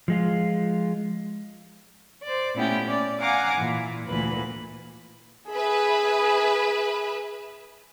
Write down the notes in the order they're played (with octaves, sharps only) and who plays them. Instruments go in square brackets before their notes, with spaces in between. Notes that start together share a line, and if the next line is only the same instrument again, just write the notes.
[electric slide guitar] F3 G#3 F4
[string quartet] C5 D5
A#2 A3 B3 C#4 E4 G4
C#4 D5
F5 F#5 G#5 A#5 D6
A#2 E3
D2 A#2 E3 B4
[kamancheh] G#4 [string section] B4 E5 B5